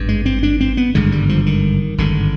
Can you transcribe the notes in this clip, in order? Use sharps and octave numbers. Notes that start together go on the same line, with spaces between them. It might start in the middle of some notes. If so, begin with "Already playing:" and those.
Already playing: G#1 G2
G#3
C4
D4
C4
B3
G#1 G2 D3 G#3
G3
F3
D#3
G#1 G2 D3